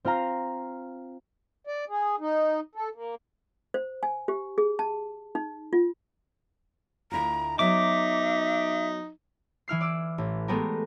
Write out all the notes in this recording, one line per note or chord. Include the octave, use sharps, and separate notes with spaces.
C4 F4 F5 A#5 F6
D5
G#4
D#4
A4
A#3
C5
G#5
G4
G#4
A5
D#4
F4
D2 E4 F4 A#5
F#3 B3 D#4 E5 D6
E3 E4 F6 C7
D5 D6 E6
A1
G#3 A3 B3 G4 A#4